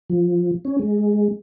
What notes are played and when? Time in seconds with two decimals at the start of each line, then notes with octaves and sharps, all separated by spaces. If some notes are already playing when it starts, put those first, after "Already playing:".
0.10 F3
0.65 C#4
0.79 G#3